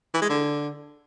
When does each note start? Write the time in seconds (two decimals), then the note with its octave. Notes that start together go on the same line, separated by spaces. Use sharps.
0.14 E3
0.22 G#3
0.29 D3